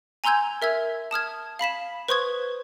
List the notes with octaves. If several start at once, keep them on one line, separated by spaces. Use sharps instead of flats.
G#5 A#5 C6 E6 G6 G#6
A#4 E5 E6 G#6
A5 D#6 F6 G#6
F5 B5 B6 E7
B4 C5 C6 C#6 D#6 G#6